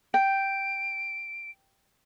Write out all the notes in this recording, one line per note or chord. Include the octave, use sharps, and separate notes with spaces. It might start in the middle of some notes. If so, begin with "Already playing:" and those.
G5 D7